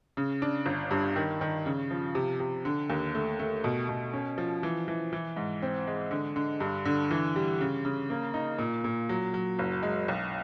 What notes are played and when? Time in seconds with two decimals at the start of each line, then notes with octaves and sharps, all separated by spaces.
0.17 C#3
0.42 D4
0.66 G1
0.91 G2
1.16 D#3
1.41 D#3
1.66 C#3
1.91 F3
2.15 C3
2.40 C3
2.65 D3
2.90 D#2
3.15 A3
3.39 A3
3.64 B2
3.89 B2
4.13 C#4
4.38 F3
4.63 E3
4.88 E3
5.13 E3
5.36 G#2
5.62 C4
5.87 G#3
6.11 D3
6.36 D3
6.60 G2
6.85 D3
7.11 E3
7.36 G3
7.61 C#3
7.85 C#3
8.10 A#3
8.34 D#4
8.59 A#2
8.84 A#2
9.09 F#3
9.34 F#3
9.59 F#1
9.83 G#3
10.08 B1